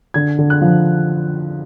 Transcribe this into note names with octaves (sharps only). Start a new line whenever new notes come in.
D3 G#6
D3
F#6
F3